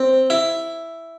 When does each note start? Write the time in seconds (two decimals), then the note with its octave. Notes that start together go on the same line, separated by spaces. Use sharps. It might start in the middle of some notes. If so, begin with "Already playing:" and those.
Already playing: C4
0.30 E4